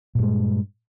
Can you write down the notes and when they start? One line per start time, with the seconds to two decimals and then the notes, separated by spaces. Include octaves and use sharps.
0.15 A#2
0.19 G2
0.23 G#3